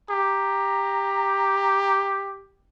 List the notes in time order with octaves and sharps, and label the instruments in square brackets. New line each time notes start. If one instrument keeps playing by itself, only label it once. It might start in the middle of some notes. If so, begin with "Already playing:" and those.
[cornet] G4 [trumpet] A#5